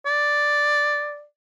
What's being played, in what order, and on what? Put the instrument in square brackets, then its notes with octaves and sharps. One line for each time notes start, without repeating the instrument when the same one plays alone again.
[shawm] D5